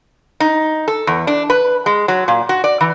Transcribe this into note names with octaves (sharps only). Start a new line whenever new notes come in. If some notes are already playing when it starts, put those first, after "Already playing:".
D#4
A4
E2
D4
B4
G#3
F#3
A#2
F#4
D5
E3